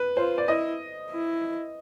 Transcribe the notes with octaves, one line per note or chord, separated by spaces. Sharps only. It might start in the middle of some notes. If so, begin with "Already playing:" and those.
Already playing: B4
F4 C5
D5
E4 D#5
E4